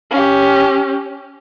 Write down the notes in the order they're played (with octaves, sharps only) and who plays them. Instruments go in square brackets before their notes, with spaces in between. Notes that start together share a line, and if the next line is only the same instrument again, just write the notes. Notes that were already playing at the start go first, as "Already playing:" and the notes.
[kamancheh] C#4 G4